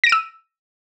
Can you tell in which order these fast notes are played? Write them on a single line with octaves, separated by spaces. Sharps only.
A#6 D7 D#7 E6